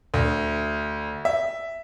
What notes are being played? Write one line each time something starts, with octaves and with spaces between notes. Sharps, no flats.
D2
E5